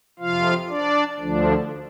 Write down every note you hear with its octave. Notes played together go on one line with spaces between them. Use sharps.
F2 C3 F3 F4 F5
D4 D5
D2 D3 F3 D4